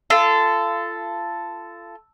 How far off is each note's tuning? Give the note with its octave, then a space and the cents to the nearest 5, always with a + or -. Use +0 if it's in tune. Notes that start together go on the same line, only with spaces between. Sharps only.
F4 -30 A4 +0